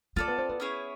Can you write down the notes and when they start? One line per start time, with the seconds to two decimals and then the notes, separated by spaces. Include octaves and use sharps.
0.16 A#3 F4 A4 D5
0.28 B3
0.38 C4
0.49 B3
0.60 C#4 E4 G#4 C#5